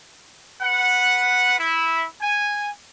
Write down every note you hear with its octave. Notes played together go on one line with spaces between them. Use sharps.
B4 F#5
E4
G#5